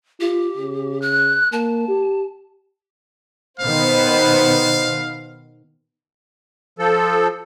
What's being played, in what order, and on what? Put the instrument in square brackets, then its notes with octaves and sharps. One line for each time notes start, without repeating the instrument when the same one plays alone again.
[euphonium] F4 [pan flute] G4
[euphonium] C#3
[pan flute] F#6
[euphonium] A#3 [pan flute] A5
[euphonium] G4
[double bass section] B2 D#3 [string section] B3 C5 [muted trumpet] F5
[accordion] F3 A4